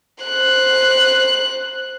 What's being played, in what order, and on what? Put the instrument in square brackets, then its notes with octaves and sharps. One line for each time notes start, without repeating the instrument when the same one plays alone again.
[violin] C5 F#6